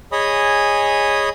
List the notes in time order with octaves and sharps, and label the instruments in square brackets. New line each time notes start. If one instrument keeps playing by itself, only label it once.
[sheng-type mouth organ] G#4 C#5 D#5 G#5 B5 D#6